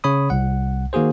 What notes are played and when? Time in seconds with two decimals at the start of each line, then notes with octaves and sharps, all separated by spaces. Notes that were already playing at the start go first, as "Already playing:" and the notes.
0.04 C#3 C#5 B5 D#6
0.30 C2 F#5
0.93 D#3 A#3 F#4 G#4 C5